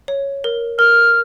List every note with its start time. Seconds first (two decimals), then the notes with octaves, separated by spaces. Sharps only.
0.08 C#5
0.44 A#4
0.78 A#4 F6